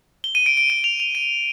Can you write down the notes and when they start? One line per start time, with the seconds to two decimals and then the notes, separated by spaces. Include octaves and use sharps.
0.24 G7
0.35 D#7
0.46 D7
0.57 D7
0.70 D#7
0.84 F7
1.00 F7
1.15 D#7